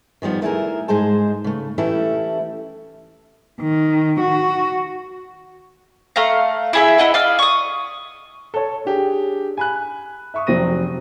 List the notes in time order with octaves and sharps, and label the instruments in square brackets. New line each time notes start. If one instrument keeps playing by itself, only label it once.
[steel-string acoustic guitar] D#3 F3 G3 B3
A3 E4 G#4 A#4
G#2 G#3 G#4 C5 A5
C#3 A3
E3 A3 C#4 E4 G4 A4
[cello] D#3
F#4
[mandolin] A3 F5 A#5
E4 G#4 E5
E4 D#5 F#5
D5 D#5 F5 E6
C#6 D#6
[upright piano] A4 C#5
D4 G4 G#4
G#5 B5 F#6
E5 C#6 D#6
F1 F#3 C4 A#6 D#7